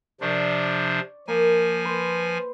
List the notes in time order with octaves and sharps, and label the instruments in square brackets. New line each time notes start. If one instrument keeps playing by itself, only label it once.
[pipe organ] C3 F3 D4 [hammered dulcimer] D5 C#6
[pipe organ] F3 G#5 [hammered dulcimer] A#3
[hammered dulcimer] B4 C5